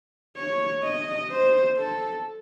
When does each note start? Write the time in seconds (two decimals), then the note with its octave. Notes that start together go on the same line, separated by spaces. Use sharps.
0.37 C#5
0.84 D#5
1.30 C5
1.77 A4